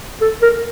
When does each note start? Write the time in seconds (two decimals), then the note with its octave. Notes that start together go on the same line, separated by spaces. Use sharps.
0.21 A4
0.42 A#4